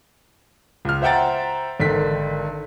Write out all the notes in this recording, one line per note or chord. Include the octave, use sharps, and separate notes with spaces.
C#2 F6
C5 E5 F#5 G5 A#5 A6
G#1 D3 D#3 B6